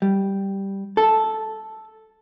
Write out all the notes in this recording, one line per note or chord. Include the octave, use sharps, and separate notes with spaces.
G3
A4